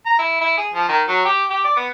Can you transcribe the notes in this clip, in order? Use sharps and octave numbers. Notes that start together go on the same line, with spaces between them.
A#5
E4
E4
G#4
F3
D#3
F#3
G4
G4
D5
B3